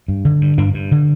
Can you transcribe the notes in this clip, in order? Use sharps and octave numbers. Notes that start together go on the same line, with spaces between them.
G2
D3
G2
G2 D4
G2
D3